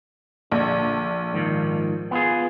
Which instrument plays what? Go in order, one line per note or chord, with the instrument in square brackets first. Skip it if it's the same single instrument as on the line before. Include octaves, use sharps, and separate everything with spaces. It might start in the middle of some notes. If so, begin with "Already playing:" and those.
[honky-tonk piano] A#1 [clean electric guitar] D3
[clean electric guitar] G#2 D#3 F3
B3 F4 G#4